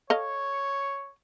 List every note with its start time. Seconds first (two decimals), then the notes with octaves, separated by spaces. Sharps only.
0.10 A4 C#5 D#5 F5